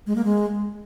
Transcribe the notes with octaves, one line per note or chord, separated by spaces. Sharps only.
G#3
A#3
G#3